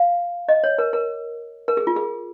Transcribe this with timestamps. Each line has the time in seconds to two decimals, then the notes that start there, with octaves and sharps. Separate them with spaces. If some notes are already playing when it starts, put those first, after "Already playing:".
Already playing: F5
0.49 D#5
0.64 C#5
0.78 A#4
0.93 A#4
1.68 A#4
1.77 G#4
1.87 F4
1.96 G#4